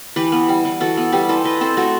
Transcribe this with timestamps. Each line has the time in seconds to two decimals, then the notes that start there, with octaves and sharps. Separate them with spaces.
0.16 E3 G4 B4
0.32 B3
0.49 G3
0.65 E3
0.80 E3 F#4 A4
0.97 B3
1.13 G3 G4 B4
1.29 E3 A4 C5
1.44 E3 B4 D#5
1.61 C4 A4 C5
1.77 A3 F#4 A4